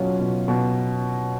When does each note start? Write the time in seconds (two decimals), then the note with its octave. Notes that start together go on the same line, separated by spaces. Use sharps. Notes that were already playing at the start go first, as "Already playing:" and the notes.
Already playing: B2 F#3 C#4 F4
0.20 B2
0.48 B2